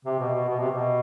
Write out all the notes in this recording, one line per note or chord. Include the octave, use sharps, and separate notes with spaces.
C3
B2
B2
B2
C3
B2